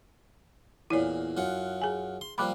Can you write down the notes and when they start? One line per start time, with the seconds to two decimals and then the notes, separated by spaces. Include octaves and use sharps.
0.91 E2 A#2 E4 C#5 D5
1.37 F#2 F4 F#5
1.82 G#4 G#5
2.21 C6
2.38 F3 G3 A#3 B5 D6 F#6